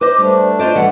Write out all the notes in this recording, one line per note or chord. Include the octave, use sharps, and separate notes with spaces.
B4 C5 D#5 D6
G3 A3 D4 C5
F4 C5 D5 D#5
E3 G3 F#5